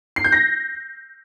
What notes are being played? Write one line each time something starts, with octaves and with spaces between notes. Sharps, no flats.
C7
G6
A#6